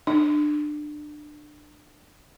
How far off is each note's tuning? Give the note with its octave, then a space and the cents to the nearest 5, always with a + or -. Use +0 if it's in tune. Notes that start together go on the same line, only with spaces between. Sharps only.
D4 +25